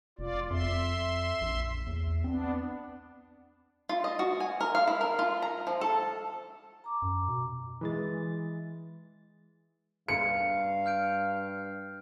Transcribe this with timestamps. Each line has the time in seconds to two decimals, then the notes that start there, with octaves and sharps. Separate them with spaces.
0.19 F1 F4 D5
0.50 F2 E5 C6
1.41 A#1
1.87 E2
2.24 B3 C4 D4
3.89 F4
4.04 D#5
4.19 F#4
4.40 G#5
4.61 A#4
4.75 F5
4.87 E4
5.01 A#4
5.19 F4
5.42 A#5
5.67 F3
5.81 A4
6.84 A#5 D6
7.02 F#2
7.28 B2
7.81 E3 G#3 A6
10.08 G2 F5 C#7
10.86 F6 G6 D7